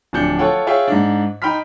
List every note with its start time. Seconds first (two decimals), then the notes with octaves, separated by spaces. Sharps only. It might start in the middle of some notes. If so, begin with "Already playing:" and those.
0.13 D1 F3 D4 G6 C#7
0.39 F4 A4 C#5 F#5 G5
0.67 F4 G#4 C#5 E5 F5 G5
0.88 G#2 D4
1.42 D#4 G5 B5 C6 F6 B6